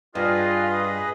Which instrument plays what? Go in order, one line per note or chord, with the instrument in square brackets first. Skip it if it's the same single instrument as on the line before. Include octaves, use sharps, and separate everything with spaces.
[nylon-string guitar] G2 [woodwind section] F4 [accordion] G#4 B4 D#5